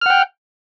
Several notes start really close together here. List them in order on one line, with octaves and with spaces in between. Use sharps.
F6 F#5 G5